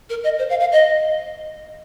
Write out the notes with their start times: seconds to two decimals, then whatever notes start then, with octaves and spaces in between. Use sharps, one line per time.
0.10 A#4
0.24 D#5
0.39 C5
0.50 F5
0.60 F5
0.72 D#5